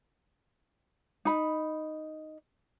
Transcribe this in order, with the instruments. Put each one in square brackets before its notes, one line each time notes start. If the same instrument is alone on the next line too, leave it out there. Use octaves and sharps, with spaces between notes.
[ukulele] D#4 B5